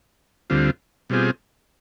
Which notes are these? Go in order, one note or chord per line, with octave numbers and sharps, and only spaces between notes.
D2 D3 G3 C4 F4
B2 G3 C4 F4 G#4